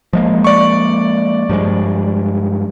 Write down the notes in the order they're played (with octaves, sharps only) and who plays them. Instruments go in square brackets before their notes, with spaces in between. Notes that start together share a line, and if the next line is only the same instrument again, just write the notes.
[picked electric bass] F3 G#3 A#3
[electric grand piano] D5 C#6
[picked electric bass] G2 F3 G#3